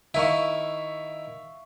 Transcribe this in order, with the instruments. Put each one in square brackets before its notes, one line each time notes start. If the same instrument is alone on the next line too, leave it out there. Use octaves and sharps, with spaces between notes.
[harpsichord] D#3 E4 [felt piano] E5 F5 C#6